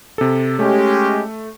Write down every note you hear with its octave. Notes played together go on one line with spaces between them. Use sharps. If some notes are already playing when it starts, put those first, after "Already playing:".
C3 A4
G#3 A3 C#4 G4